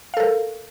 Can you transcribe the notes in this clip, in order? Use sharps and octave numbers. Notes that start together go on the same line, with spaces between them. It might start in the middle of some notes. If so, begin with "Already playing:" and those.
A4 A#4 F5